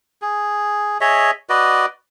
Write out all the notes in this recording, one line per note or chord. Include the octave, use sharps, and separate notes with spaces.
G#4
G#4 C#5 D#5 E5
F#4 B4 D5 D#5